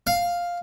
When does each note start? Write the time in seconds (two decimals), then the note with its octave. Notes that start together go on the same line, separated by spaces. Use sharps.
0.07 F5